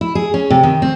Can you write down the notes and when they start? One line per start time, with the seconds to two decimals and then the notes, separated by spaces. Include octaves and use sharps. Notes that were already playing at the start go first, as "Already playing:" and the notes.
0.01 E4
0.15 G#4
0.34 C#4
0.50 C3
0.63 D#3
0.82 C4